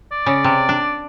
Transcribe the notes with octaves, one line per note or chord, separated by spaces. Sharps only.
D5
C#3
C3
D4